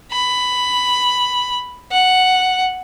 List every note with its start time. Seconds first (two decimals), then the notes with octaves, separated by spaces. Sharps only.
0.12 B5
1.92 F#5